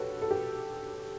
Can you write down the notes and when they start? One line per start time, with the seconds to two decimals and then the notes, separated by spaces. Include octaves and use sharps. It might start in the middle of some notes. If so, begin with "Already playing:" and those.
Already playing: F#4 G4 A4 B4 C#5
0.22 A4
0.31 G4